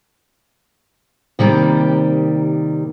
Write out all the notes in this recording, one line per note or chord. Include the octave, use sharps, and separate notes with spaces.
C3 D#3 G3 A#3